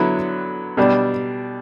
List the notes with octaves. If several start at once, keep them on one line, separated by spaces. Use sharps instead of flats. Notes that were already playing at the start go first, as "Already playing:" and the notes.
Already playing: D3 F#3 B3 E4
B2 G3 D4